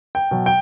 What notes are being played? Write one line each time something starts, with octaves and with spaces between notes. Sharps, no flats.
G5
B2 F#3
G5